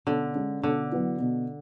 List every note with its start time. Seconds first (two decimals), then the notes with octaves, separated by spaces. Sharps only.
0.07 B2 D3
0.35 G#3 C#4
0.63 B2 D3
0.92 F#3 B3 E4
1.20 B2